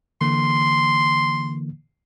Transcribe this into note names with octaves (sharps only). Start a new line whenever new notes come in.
D3 E3 A#3 C6